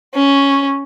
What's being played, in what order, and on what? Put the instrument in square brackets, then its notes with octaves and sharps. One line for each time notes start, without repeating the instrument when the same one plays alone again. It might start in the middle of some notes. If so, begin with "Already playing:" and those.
[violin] C#4